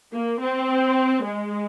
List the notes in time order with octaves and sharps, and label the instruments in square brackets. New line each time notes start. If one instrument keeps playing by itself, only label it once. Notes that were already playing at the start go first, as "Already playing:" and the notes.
[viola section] A#3
C4
G#3